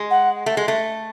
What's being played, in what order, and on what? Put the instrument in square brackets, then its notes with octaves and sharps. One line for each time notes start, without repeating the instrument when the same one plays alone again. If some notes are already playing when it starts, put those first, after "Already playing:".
Already playing: [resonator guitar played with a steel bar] G#3
[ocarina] F#5
[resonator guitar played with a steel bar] A3
G#3
A3